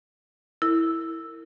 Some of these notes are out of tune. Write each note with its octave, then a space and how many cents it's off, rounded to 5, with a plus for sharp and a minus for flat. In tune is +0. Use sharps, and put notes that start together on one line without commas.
E4 +0 A#4 -30